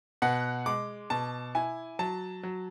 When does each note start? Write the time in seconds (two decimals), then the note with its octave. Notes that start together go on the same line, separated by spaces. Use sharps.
0.22 B2 F#5
0.66 G#3 D6
1.10 B2 A5
1.55 E4 G#5
1.99 F#3 A5
2.43 F#3